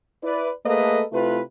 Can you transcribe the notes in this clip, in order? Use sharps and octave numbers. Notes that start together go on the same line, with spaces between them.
E4 B4 D5
A3 A#3 G#4 A4 B4 D#5
C3 A3 E4 F4 B4